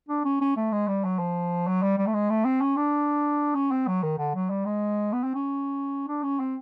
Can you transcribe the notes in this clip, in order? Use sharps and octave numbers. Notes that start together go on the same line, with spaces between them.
D4
C#4
C#4
A3
G#3
G3
F#3
F3
F#3
G3
G3
A3
G#3
A3
C4
C#4
D4
C#4
C4
F#3
D#3
D3
F#3
G3
G#3
B3
C4
C#4
D4
C#4
C4